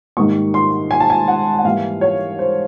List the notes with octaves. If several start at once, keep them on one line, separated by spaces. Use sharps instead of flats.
G#2 D#3 G3 A#3 C#6
C6
G#5
A5
G#5
F#5
F#5
G#2 E3 G3 A#3 F5
C#5
C5